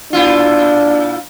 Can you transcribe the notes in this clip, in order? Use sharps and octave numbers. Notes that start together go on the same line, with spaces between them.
A#2 D4 E4 F4